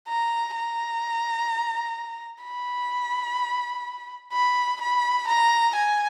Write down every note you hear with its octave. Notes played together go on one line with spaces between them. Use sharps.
A#5
A#5
B5
B5
B5
A#5
G#5